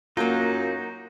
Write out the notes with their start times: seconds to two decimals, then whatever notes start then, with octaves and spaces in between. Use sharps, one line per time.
0.17 F#2 A#3 D#4 F4 F#4